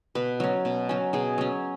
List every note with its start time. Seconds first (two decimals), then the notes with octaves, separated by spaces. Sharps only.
0.15 B2 B4
0.40 F#3 C#4
0.65 B2
0.89 F#3 C#4
1.13 B2 G#4
1.38 F#3 C#4